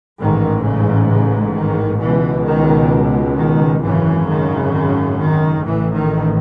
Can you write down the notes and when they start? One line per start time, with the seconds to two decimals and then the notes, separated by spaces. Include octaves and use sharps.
0.19 A1 G#2 D#3
0.64 C#3
1.09 C#3
1.55 D#3
2.00 C#2 B2 E3
2.46 D#3
3.37 D#3
3.82 G#1 F#2 C#3 E3
4.27 D#3
4.73 D#3
5.18 D#3
5.64 A1 A2 E3
5.94 D#3